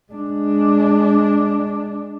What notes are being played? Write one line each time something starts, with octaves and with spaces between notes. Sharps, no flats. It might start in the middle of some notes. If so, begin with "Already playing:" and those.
G#3 D4